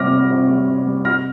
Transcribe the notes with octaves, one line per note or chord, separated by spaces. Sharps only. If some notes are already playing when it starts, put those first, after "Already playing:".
Already playing: C3 G3 D6 F6 A#6
G3
C3
G3
C3
G3
C3 F6 A#6